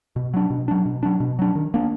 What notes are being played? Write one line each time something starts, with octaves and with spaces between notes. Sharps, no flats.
B2
F#3 D4
B2
F#3 D4
B2
F#3 D4
B2
F#3 D4
D#3
A#3 D4